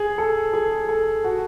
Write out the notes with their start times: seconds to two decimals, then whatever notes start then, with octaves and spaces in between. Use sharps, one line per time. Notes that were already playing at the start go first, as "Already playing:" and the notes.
Already playing: G#4
0.18 A4
0.54 G#4
0.89 A4
1.24 F#4